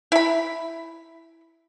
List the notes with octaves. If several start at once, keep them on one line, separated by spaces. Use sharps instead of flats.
E4 B5